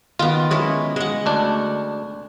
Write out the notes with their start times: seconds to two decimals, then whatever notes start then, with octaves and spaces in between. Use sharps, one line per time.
0.19 D#3 B3 F4
0.51 G#3 C#4 E4
0.96 G#3 F#5
1.26 D2 D4